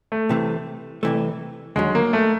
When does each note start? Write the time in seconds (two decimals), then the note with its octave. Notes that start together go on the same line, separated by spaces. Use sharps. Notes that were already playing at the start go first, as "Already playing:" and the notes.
0.12 A3
0.29 C2 C3 E3 A3
1.03 C2 C3 E3 A3
1.76 D#2 D3 F#3 G#3
1.95 A#3
2.13 A3